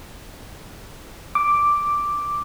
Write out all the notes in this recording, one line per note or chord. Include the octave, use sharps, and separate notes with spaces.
D6